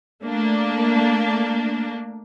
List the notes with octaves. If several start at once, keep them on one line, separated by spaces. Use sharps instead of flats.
A3 A#3 D4